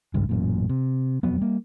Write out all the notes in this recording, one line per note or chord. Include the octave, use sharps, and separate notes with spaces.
G#1 C#2 G2
A1 F#2 A#2
C3
E1 F2 F#3 B3
G3 A#3